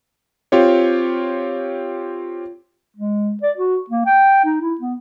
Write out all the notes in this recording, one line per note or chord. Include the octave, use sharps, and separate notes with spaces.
C4 F4 G4 C#5
G#3
D5
F#4
A#3
G5
D#4
E4
B3